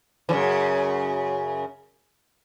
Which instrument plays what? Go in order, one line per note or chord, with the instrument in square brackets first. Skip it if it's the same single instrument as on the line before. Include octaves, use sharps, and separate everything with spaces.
[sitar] F#2 C#3 E3